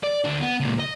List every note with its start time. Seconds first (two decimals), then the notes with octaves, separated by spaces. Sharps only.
0.03 D5
0.24 D2 D4
0.40 B3
0.60 C#2 A#2
0.79 D#5